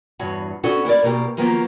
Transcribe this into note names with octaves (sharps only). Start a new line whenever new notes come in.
E2 G2 F#4 C#5
B3 C#4 D4 F#4 A4 C5
E4 G4 A#4 D5
B2 A#3 F#4 G4
D#3 F3 F#3 A#3 B3